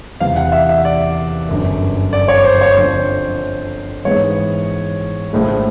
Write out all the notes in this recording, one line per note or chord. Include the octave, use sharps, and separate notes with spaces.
E2 C3 E3 F5
F#5
E5
E5
D5
G1 F#2 D3
D5
C#5
C5
C#5
F2 D3 F3 C5
G#2 E3 G#3 B3 C#5
A#1 A2 F3 G#3